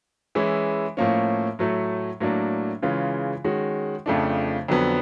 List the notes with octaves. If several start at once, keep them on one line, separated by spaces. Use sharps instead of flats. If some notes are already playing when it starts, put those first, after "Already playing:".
E3 G#3 C#4 E4
A2 F3 A#3 C#4
A2 F#3 A3
A2 F#3 A#3 D4
C#3 E3 G#3 C#4 F4
D#3 G#3 C#4 F#4
F2 C#3 F3 A3 D4
F2 D3 F#3 B3